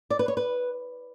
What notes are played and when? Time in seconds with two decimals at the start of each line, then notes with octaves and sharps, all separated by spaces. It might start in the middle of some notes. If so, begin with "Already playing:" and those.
0.10 D5
0.19 B4
0.28 C#5
0.37 B4